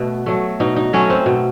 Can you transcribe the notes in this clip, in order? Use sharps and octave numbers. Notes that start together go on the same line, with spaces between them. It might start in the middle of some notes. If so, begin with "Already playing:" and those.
Already playing: B2 A3 B3
F#3 A3
B2 D#4
D#4
F#3 A3 C#4
C4
B2